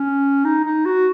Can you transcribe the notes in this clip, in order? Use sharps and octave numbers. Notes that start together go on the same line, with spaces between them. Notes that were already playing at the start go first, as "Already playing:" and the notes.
Already playing: C#4
D#4
D#4
F#4